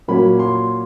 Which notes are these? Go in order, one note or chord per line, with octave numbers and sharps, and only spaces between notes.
A#2 F#3 A#3 C#4 B5
C6